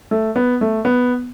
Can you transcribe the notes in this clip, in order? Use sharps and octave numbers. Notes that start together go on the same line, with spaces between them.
A3
B3
A3
B3